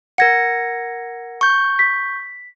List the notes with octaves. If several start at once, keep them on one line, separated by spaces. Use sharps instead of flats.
A#4 F#5 G#6 A#6 C#7
C#6 G6
B6